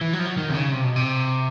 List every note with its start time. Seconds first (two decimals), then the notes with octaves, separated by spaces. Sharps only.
0.01 E3
0.13 F#3
0.19 F3
0.25 F#3
0.37 D#3
0.50 C3
0.54 C#3
0.72 C3
0.84 B2
0.96 C3